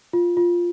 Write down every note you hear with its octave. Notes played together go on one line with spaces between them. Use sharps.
F4
F4